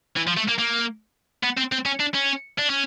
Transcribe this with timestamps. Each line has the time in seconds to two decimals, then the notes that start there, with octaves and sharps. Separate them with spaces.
0.17 E3
0.28 F3
0.37 A3
0.49 A#3
0.59 A#3
1.43 B3
1.57 C4
1.72 C4
1.86 C#4
2.00 D4
2.14 C#4
2.58 D4
2.70 C#4